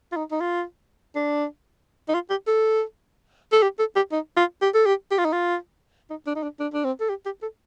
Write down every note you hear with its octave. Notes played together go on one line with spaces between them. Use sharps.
F4
D#4
D#4
F4
D4
D#4
F4
G4
A4
A4
G4
A4
G4
D#4
F4
G4
A4
G4
G4
F4
D#4
F4
D#4
D4
D#4
D4
D4
D4
C4
A4
G4
G4
A4